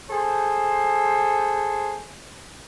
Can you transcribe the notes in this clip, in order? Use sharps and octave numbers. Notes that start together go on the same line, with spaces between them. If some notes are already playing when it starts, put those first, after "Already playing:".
G#4 A4 C5